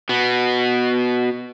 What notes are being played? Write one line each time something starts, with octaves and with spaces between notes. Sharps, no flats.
B2 B3